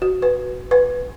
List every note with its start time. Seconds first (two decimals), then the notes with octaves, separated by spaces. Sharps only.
0.02 F#4
0.22 B4
0.71 B4